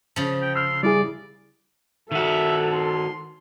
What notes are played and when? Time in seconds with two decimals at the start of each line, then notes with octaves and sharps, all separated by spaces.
0.16 C#3 F3
0.42 G5
0.56 C6 E6 F6
0.83 G3 E4 G#4 D5
2.12 D#3 F#4 A4 E5
2.73 C6